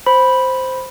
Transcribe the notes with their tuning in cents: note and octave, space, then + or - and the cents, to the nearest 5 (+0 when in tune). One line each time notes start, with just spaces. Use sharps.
C5 +0 B5 -5